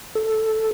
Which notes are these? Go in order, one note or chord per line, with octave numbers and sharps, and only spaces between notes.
A4